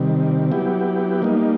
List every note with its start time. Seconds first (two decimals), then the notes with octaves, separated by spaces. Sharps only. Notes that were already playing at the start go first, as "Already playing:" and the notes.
Already playing: C3 D#3 G3
0.51 F#3 B3 E4 G4
1.22 G3 A#3 D#4